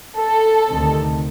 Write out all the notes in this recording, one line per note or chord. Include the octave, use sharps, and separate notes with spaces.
A4
D2 C3 D#3